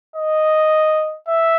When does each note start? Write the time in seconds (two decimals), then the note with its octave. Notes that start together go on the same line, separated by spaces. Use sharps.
0.16 D#5
1.28 E5